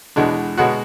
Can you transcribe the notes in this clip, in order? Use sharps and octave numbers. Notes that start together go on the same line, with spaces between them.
E2 B2 G#3 D4
B2 G#3 B3 F#4